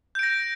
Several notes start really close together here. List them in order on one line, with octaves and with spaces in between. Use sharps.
G6 D7 A#6